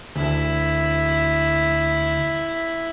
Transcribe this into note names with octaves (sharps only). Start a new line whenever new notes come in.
D2 E4